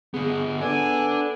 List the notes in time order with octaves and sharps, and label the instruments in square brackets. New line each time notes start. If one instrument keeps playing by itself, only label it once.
[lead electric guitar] D3 B3 [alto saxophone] G#4
[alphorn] B3 [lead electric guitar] D4 D5 [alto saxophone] A4 [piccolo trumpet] G#5